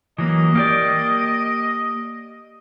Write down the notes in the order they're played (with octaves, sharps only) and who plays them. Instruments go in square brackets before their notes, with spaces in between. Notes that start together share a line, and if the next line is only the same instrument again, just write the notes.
[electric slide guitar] E3 F#3 A#3 [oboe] D#5
[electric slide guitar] A#3 G4 D5